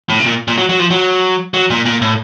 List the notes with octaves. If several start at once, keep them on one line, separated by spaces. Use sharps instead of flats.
A2
C3
A#2
A#2
F#3
F#3
F3
F#3
F#3
A#2
A#2
A2